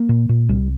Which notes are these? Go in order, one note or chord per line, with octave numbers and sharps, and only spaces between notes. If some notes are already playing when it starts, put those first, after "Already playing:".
Already playing: A#3
A#2
A#2
C2 G3